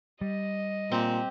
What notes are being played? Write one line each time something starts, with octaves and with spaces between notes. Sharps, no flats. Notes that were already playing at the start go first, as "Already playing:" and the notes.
G3 D#5
A#2 C4 G4